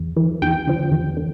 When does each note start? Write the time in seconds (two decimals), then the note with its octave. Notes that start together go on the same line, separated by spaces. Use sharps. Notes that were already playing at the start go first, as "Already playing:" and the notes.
Already playing: E2
0.17 E3
0.42 E2 G5
0.67 D3 F3
0.92 E2
1.17 D3